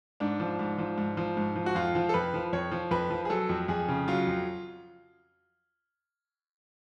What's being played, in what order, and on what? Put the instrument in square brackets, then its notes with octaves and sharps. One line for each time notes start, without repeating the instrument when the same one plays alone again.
[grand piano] G#2 D4
F3
G#2
F3
G#2
F3
G#2
F3
F#4
F2 F4
F3
A4
F2 B4
F3
F2 C#5
F3
F2 B4
F3
G#4
F#3 A4
F2
F2 G#4
C#3
F#3 F4
F2